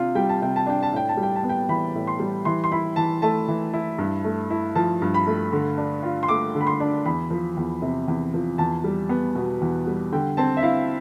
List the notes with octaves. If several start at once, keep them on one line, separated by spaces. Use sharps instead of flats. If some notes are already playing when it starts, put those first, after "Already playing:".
Already playing: C3 D4 F4
G3 G5
A5
C3 G5
A5
D4 G5
A5
A2 G5
A5
G3
G5
A5
B3
G5
E3 B5
A2
C6
G3
E3 C6
C6
E4 B5
E3 A5
A3 A5
E3
E4
G2
A3
E4
F3 A5
G2
B5
A3
D3
D4
F4
C6
A3 D6
D3
B5
C6
D4
E2 B5
F3
E2
C3
E2
F3
E2 A5
G3
B3
B2
E2
G3
D3 G5
C4 A5
E5
E4 F5